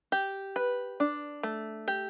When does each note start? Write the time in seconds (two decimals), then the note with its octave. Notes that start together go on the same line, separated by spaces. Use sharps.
0.12 G4
0.56 B4
1.00 D4
1.43 A3
1.88 G4